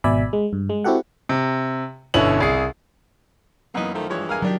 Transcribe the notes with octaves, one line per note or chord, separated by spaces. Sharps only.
G#1 B2 D5 E5 G#5 B5
G#3
G2
G#3
C4 E4 F#4 G4 A4 F#5
C3
G1 B2 D3 C#4 E4 F#7
C2 G#4 C7
F#2 E3 A#3 B3 D#4
D#3 F3 A3
G2 E3 F3 G#3 C#5
A#4 F5 G#5
D#3 F#3 D4 G4